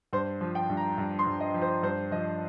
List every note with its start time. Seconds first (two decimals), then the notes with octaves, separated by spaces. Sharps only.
0.13 G2 C5
0.41 F3
0.55 G5
0.70 G2
0.77 A#5
0.98 G2
1.19 C6
1.27 G2
1.40 D#5
1.54 F3
1.62 C5
1.83 G2 C5
2.11 F3 D#5